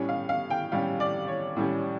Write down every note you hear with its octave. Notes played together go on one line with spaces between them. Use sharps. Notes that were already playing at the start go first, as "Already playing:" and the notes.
Already playing: A2 G3 C#4
F5
F5
G5
A2 G3 C#4 F5
D5
C#5
A2 G3 C#4